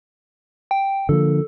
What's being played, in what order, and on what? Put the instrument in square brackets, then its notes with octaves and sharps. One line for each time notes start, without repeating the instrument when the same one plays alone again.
[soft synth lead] G5
[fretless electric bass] D3 F3 A#3 [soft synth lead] A4